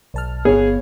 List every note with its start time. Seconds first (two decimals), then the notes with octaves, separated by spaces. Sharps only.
0.14 B1 A5 F6
0.45 G1 B3 G#4 C#5 F5